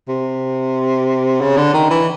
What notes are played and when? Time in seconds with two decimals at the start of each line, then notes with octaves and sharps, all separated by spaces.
0.08 C3
1.41 C#3
1.57 D3
1.74 D#3
1.90 E3